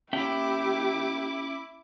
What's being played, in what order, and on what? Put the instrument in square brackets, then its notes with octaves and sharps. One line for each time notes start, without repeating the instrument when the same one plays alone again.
[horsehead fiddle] A#3 G4 [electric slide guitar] C#4 E5 G5 [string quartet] E4 D6